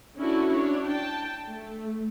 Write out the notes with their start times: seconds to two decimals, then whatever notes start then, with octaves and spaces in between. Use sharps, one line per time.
0.17 C#4 D4 E4 F#4 A4
0.52 D4 C#5
0.85 G5 A5
1.48 A3